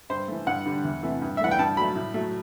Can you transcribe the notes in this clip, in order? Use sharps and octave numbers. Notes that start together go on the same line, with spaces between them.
G2 C5
E3 A3
G2 F#5
D3 G3
E2
C3 E3 A3
G2
E5
E3 A3 F#5
G5
G2 A5
F#3 A3 B5
A2
F#3 A3